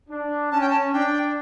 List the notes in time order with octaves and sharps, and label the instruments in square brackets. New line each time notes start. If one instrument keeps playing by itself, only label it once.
[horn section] D4
[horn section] C#4 [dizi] A5
[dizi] G5
A5
[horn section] D4 [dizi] G5